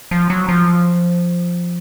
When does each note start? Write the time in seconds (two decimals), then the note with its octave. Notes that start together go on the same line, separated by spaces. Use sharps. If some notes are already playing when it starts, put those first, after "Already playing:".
0.11 F3
0.30 F#3
0.49 F3